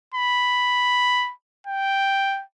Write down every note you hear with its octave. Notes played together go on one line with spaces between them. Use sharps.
B5
G5